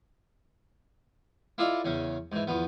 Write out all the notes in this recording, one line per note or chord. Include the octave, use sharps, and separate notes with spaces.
E4 F4 A4 D5 D#5 F5
E2 C#3 C#4
G#2 E3
E2 F3 B3